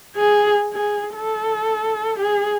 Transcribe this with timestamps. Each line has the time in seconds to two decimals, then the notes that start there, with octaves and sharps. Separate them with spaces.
0.16 G#4
0.73 G#4
1.15 A4
2.20 G#4